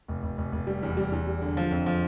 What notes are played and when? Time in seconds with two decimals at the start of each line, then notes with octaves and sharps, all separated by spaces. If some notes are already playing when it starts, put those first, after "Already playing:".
0.08 F1
0.23 F1
0.38 F1
0.52 F1
0.67 G3
0.83 E2
0.97 G3
1.12 E2
1.27 G3
1.42 D3
1.57 F3
1.71 F2
1.86 F3